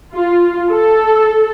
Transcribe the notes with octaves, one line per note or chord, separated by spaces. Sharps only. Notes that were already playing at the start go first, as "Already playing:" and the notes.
F4
A4